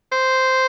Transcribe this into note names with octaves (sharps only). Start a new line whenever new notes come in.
C5